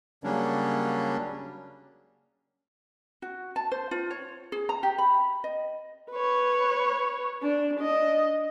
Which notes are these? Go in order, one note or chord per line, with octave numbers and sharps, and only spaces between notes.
C#3 F#3 G3 A#3 C#4 D4
F#4
A5
C5
F4
C#5
G#4
A#5
G4
B5
D#5
B4 C#5
D4
D4 D#5